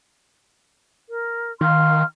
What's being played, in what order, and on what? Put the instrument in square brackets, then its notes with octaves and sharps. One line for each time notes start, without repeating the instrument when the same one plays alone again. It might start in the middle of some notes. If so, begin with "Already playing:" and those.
[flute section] A#4
[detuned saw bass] D#3 [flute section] F5 C6 F6